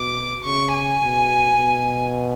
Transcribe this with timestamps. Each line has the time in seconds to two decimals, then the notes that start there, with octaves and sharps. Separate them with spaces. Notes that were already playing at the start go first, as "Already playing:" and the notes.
Already playing: B2 D6
0.45 C#3 C#6
0.73 G#5
1.02 B2
1.58 B2